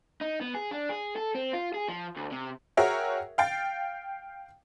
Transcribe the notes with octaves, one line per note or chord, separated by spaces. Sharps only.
D#4
B3
G#4
D4
G#4
A4
C4
F4
G#4
F3
D2
C3
F#4 G#4 A#4 C#5 E5 G5
F5 G5 A6